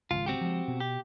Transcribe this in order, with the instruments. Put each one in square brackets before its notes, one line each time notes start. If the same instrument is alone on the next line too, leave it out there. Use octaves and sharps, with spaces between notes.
[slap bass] G#1 C#2 [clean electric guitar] F4
[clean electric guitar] C4 F#4 G4
[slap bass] F3 G3 G#3
B2
[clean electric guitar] G4